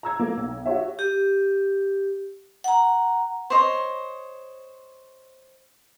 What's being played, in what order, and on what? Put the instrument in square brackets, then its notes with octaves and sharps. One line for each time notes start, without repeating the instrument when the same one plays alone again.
[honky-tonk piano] A#5 E6 G#6
A3 A#3
B1
F#4 G4 C#5 E5
[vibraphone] G4
F#5 A#5
[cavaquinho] C5 C#5 D#5